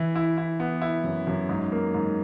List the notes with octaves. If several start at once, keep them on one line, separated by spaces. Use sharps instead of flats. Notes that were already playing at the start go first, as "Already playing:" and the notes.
Already playing: E3 E4
E4
E4
B3
E4
F#2
F#2
G#2
A#3
G#2